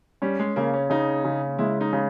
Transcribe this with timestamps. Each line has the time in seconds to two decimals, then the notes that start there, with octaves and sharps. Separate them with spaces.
0.22 G3 C#4
0.39 G#3
0.56 C#3 A#3
0.73 C#4
0.90 C#3 D#4
1.24 C#3
1.58 G#3 E4
1.81 D#4
1.93 C#3